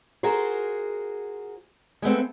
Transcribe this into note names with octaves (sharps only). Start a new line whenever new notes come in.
F4 F#4 G#4 A#4 C5
G#3 A3 B3 C4